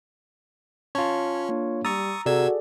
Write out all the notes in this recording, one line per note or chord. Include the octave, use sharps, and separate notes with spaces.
C#4 F4 C#5 A5
A#3 D4
G3 A#5 C#6 D#6 E6 A6
C3 F#4 G#4 A4 D5 E6 G#6